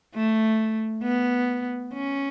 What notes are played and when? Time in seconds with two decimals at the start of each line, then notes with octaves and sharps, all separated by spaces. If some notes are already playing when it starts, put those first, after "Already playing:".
0.15 A3
1.03 B3
1.93 C#4